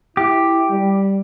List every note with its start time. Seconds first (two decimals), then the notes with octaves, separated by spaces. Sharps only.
0.17 E4 G4
0.70 G3